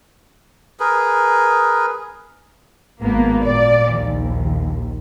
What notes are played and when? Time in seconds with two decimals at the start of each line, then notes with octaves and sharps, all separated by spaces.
0.80 G#4 A#4 B4
3.02 G#1 A#3 B3
3.45 A#2 D5
3.92 A#1 D#2